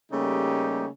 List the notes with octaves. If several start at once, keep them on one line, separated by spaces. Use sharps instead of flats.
C#3 G3 A3 A#3 D#4 G4